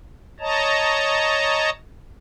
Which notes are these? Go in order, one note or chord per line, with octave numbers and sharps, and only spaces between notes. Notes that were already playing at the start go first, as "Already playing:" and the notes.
C#5 D#5 A5 A#5